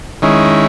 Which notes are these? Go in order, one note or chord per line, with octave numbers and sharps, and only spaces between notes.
D#3 G#3 C#4 E4